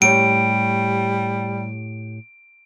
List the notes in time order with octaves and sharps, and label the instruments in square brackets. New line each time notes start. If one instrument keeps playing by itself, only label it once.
[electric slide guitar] A2 G4 C#5 [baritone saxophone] G3 [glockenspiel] D7